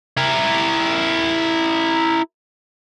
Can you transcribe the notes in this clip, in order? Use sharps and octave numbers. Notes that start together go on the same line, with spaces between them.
E4 A#4